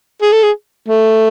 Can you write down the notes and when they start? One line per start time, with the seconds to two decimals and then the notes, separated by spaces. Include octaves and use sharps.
0.22 G#4
0.32 A4
0.43 G#4
0.89 A3